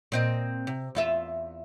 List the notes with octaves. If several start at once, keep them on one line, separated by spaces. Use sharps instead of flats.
A#2 C4 D#5
C3
E2 F4 E5